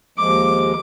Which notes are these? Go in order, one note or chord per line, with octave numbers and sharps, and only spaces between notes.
D#2 F3 G#3 D6